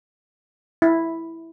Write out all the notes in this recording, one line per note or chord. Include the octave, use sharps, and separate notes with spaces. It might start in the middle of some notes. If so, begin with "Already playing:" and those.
E4